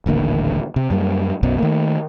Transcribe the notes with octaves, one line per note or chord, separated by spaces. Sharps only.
D#1 A1 D3 A#3
C3
F#2 G3 A#3
B1 F#2 B2 F#3
D#3 A3 A#3